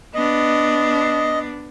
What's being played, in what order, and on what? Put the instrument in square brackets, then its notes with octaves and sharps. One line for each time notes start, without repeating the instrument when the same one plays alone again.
[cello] B3 D4 [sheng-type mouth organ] D#5